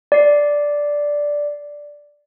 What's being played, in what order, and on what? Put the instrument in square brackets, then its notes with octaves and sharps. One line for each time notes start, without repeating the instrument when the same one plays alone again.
[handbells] D5 C7